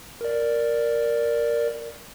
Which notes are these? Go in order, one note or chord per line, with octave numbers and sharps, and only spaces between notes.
A#4 D5